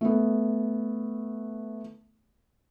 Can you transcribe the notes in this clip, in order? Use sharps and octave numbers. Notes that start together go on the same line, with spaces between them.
A3 B3